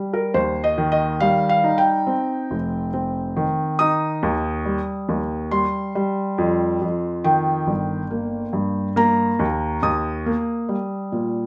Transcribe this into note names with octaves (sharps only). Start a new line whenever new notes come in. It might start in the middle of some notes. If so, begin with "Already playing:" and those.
Already playing: G3
A#4
D#2 C5
D#5
D#3
D#5
G3 F5
F5
D#4
G5
C4
F1
C4
D#3
D#4 D#6
D#2
G3
D#2
G3 C6
G3
F2
F2
D#3 G5
G1
A#3
G2
A#3 A#5
D#2
D#2 D#6
A#3
G3
A#2